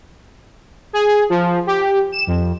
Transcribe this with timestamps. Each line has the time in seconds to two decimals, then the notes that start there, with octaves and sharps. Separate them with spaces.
0.93 G#4
1.29 F3
1.67 G4
2.12 E7
2.27 F2